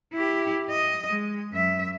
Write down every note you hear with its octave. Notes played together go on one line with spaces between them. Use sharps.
E4 G4
D#5
G#3
F#2 E5